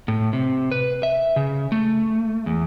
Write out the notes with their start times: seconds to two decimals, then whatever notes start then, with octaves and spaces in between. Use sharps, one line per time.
0.08 A2
0.33 C3
0.72 B4
1.03 E5
1.36 C#3
1.72 A3
2.46 E2